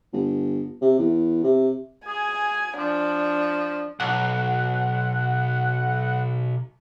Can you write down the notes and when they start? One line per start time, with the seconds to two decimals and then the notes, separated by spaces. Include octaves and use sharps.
0.13 G1
0.82 C3
0.99 E2
1.44 C3
2.07 G#4 G#5
2.78 F3 D4
4.00 B1 F#5